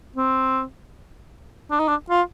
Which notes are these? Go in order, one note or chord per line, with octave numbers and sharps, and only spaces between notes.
C4
D4
D#4
D4
F4